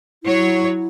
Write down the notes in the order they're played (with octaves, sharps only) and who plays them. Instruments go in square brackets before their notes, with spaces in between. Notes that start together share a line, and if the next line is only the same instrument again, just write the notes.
[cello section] F#3 C#5 [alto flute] E4